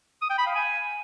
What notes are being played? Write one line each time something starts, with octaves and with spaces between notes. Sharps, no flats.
D#6
G5
B5
F5
G#5